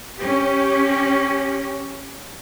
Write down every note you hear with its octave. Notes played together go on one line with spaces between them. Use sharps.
C#4 G4